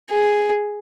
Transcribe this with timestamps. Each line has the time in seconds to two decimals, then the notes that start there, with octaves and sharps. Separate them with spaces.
0.11 G#4